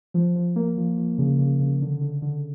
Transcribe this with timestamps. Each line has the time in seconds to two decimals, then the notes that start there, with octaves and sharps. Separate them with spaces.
0.14 F3
0.36 F3
0.56 A#3
0.77 F3
0.97 F3
1.18 C#3
1.39 C#3
1.60 C#3
1.82 D3
2.01 D3
2.22 D3